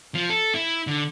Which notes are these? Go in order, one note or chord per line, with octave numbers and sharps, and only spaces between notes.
F3
A4
E4
D3